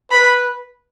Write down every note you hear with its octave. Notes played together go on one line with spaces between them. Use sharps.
B4 B5